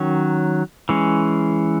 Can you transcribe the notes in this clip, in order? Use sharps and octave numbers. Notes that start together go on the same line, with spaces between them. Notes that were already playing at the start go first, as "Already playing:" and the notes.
Already playing: D#3 F#3 C#4
E3 G#3 C#4